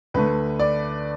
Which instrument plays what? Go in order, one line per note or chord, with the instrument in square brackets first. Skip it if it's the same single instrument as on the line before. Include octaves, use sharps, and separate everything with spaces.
[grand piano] D2 D3 A3 B4
D5